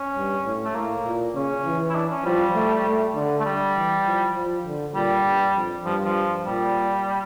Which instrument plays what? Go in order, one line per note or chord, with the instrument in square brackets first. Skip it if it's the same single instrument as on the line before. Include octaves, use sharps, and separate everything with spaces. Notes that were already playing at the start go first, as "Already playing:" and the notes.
Already playing: [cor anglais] C#4
[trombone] G2
A2
[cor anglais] A3
[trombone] A2 [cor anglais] A#3
[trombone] A#2
[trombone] C#3 [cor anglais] C#4
[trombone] E3
[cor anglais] E4
D4
C#4
[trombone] F3 [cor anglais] G3
[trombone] A3
A3
D3
[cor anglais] A3
G3
[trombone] E3
F3
F3
D3
[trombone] A#2 [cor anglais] G3
[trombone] G2
F2
[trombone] G2 [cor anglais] F3
[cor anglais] F3
[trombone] A#2 [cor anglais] G3